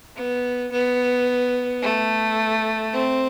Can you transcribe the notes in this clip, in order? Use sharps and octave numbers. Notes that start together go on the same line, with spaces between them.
B3
B3
A3
C4